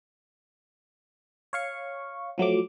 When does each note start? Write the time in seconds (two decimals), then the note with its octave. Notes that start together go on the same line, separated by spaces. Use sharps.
1.53 C#5 F5 C#6
2.38 F3 F#3 A3 D6